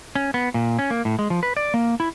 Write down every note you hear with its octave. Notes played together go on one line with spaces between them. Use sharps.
C#4
B3
A#2
C#4
A#3
A2
G#3
F3
B4
D5
A#3
E4